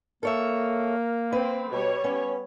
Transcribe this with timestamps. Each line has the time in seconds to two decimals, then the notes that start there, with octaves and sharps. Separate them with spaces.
0.23 A#3 A4 A#4 C#5 E5
1.32 C4 B4
1.72 B2 G3 C#5
2.04 B3 C#4